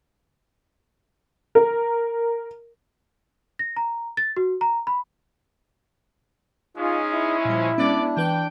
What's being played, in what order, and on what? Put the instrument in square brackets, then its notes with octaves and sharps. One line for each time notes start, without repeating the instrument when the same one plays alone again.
[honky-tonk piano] A#4
[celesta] A#6
A#5
A6
F#4
A#5
B5
[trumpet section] G#3 C#4 [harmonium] D#4 G#4 [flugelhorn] F4
[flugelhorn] E4
[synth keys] A#2 G3 [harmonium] F3
[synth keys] G#3 B3 C#4 [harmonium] D4 [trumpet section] D5 D6
[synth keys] E3 B4 G6 [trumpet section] G5